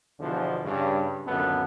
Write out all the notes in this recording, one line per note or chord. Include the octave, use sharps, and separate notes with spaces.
E2 B2 D3 E3 F3
G2 C#3
G#1 C#2 F#2 D3 B3 A4